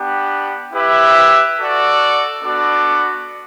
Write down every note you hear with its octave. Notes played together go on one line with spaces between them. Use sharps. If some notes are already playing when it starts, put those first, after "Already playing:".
Already playing: B3 D4 G4
E4 G4 B4 E5
F#4 A4 D5
B3 D4 F#4 A4 D5